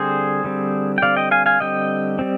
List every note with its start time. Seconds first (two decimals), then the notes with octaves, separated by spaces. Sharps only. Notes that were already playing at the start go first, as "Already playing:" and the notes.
Already playing: D3 G3 C4 G#4 C5
0.44 D3 G3 C4
0.98 G5
1.02 D3 G3 C4 D5 F5
1.17 D#5 G5
1.31 F5 G#5
1.46 F5 G#5
1.60 D3 G3 C4 D#5 G5
2.19 G3 C4